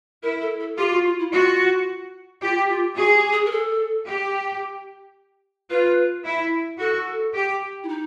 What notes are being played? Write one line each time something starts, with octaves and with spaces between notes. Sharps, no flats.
E4 A#4
A4
A4
F4 G4
F#4
F4
E4
F4 F#4
F4 G4
F4
F#4 G#4
G4
G#4
A#4
A4
G4
F4 B4
E4
F#4 A4
G4
E4
D#4